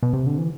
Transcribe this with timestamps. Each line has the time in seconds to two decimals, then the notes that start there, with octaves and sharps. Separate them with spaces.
0.03 B2
0.13 C3
0.27 D3
0.38 E3